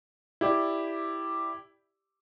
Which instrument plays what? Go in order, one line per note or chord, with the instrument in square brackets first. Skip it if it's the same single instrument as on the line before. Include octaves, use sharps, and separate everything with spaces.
[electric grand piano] E4 G4 D5